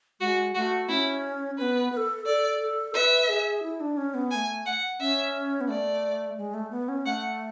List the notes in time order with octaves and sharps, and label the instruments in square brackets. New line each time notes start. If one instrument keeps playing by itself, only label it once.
[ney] G#3 [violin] F#4
[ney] A3 [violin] F#4
[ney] C#4 [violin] E4
[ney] B3 C#4 [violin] B4
[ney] B4
A4
[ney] A4 [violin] D5
[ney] A4
[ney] B4 [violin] E5
[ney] G#4
E4
D4
C#4
B3
[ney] B3 [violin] G#5
[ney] A3
[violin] F#5
[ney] C#4 [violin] E5
[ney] B3
[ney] A3 [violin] D5
[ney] G#3
A3
B3
C#4
[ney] A3 [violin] F#5